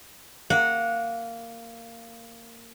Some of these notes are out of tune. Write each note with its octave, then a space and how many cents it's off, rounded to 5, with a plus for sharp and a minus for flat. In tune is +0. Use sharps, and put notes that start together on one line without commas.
A#3 -15 F#5 -20